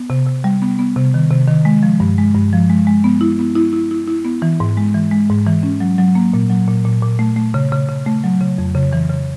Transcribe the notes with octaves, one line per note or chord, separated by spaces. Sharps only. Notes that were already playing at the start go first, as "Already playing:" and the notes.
Already playing: B3
C3
C3
G3
B3
B3
C3
D#3
C3
D#3
G#3
F3
G2
G#3
G2
F3
G#3
G#3
B3
E4
B3
E4
E4
E4
E4
B3
E3
G#2
G#3
E3
G#3
G#2
E3
C#4
F#3
F#3
A#3
A#2
F#3
A#2
A#2
A#2
A3
A3
C#3
C#3
C#3
A3
F#3
C#3
F2
C#3
E3
C#3